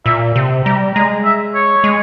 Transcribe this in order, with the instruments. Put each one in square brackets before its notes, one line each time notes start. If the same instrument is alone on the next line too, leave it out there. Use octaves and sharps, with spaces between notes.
[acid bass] A#2 [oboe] E5
[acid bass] C3
[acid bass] G3 [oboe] A#5
[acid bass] G#3 [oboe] A#5
[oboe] E5
C#5
[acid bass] G#3